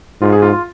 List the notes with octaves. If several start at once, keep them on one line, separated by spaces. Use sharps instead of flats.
G#2 F4
G#4
F4
F4